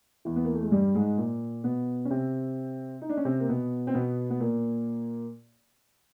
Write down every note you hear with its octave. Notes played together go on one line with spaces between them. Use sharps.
E2 E3
B3
A#3
A3
G#3
G2 G3
G#2 G#3
A#2 A#3
B2 B3
C#4
C3 C4
D#4
D4
C#4
C3 C4
A#3
B2 B3
C4
B2 B3
B3
A#2 A#3